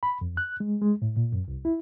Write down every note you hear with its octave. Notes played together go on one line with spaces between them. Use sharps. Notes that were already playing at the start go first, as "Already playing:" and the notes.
B5
F2
F#6
G#3
G#3
A2
A#2
F#2
C2
E4